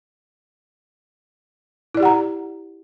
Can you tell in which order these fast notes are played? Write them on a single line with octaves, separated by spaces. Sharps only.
E4 D5 G4 F#5 A#5